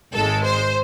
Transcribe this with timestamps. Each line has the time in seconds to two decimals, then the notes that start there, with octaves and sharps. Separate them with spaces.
0.13 G#1 G#2 G#3 A4
0.45 C5